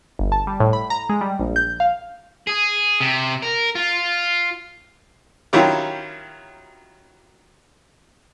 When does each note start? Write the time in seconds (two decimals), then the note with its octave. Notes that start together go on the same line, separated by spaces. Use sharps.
0.19 G1
0.32 A5
0.47 G3
0.60 A2
0.73 B5
0.90 A#5
1.09 G#3
1.21 G3
1.40 A#1
1.56 G6
1.80 F5
2.47 G#4
3.00 C3
3.42 A#4
3.75 F4
5.53 D#3 F#3 C#4 E4 F4 G4